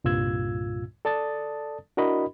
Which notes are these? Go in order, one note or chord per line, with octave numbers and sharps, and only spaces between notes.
C2 G2 A#2 F4 E6 G#6
A4 D5 A5 D#6 A6
D4 E4 F#4 A#4 D#5 B5